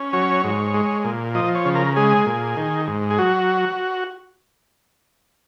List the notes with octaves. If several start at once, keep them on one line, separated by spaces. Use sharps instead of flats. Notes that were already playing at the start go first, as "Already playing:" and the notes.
Already playing: C#4
F#3 C#5
G#2
G#3
A#2
F3 D#5
C#5
C#3
A#4
G#3 G#4
A#2
D#3
G#2
G#4
F#3 F#4